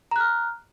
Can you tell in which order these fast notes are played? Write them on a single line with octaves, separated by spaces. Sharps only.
A#5 F#6 F6